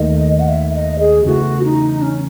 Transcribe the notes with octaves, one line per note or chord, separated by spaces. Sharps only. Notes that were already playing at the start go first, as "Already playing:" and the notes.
Already playing: D#2 D#3 A3 D#5
F#5
E5
D#5
G#4
E2 C#3 E3 A3 F#4
D#4
C#4